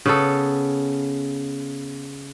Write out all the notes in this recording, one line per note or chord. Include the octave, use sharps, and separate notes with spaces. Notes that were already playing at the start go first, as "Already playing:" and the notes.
C#3 B3 A4